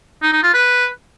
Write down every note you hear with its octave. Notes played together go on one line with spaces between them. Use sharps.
D#4
D#4
F4
B4